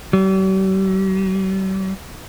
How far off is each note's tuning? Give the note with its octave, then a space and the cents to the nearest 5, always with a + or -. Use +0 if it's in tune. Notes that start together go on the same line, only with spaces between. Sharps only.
G3 -45